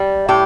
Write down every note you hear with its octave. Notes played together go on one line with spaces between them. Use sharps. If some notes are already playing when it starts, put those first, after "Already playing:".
Already playing: G3
A2 G4